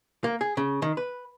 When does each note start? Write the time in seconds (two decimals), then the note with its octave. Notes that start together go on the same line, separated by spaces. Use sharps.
0.24 A#3
0.41 G#4
0.57 C#3
0.82 D#3
0.97 B4